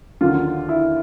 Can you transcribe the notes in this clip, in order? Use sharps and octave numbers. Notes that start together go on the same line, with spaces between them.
D#2 D3 F#3 F4
E4